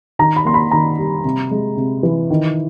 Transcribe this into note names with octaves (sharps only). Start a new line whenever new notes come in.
D#3 A#5
B5
A#3 C6
B5
D#3 A#5
G3
C3
G#3
C3
E3
D#3